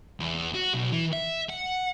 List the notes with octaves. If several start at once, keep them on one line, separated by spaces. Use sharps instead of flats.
E2
F#4
B1
E3
E5
F#5